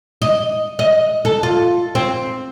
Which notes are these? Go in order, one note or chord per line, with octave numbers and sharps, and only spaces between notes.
D#5
D#5
A4
F4
C4